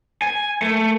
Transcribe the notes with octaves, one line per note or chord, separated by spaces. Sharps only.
G#5
A3